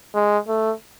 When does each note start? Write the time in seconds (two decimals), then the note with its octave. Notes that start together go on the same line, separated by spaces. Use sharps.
0.15 G#3
0.48 A3